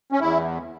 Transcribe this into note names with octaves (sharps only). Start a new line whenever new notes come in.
C#4
E2 E4